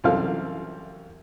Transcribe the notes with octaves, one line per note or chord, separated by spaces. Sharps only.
C2 F#2 E3 C4 A4 F5